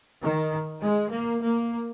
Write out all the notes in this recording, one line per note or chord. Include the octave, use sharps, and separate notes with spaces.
D#3
G#3
A#3
A#3